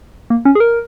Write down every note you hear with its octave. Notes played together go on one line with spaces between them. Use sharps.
A#3
C#4
G#4
A#4